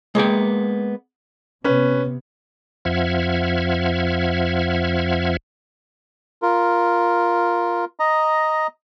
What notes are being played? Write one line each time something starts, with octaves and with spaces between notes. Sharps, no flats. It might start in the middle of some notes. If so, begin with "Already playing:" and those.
G#3 A#3 B3 G5
C3 B3 C#4 B4
F2 F3 E5 F#5 F6 G#6
F4 A#4
D#5 A#5